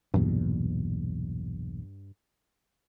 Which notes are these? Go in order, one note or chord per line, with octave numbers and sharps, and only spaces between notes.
B1 E2 G2 A#2